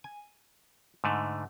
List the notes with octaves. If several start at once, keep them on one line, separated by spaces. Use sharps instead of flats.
G#5
G#2 D3 A3